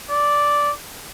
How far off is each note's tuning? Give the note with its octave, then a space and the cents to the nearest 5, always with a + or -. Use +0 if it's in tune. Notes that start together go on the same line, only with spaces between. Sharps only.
D5 -5